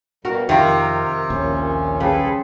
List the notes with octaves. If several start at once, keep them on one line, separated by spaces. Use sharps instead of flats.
B2 G3 A#3 F#4 A#4
F2 C3 D#3 F4 A#4
A#1 D#2 A#2 C#4
C#3 G3 G#4 A4 B4